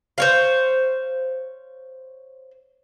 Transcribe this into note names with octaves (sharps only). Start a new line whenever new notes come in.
C5 C#5 F5